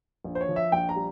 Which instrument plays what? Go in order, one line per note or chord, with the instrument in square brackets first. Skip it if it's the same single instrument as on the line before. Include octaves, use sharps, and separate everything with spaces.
[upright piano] A#1
C5
C#5
F3
E5
A#1 G5
A#5
G3